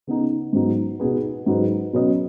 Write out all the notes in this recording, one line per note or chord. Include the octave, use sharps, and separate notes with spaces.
C#3 B3 D#4
G#2 F#3 B3 D#4
B2 B3 D#4 G#4 B4
G#2 F#3 D#4 G#4 B4
B2 F#3 C#4 B4 D#5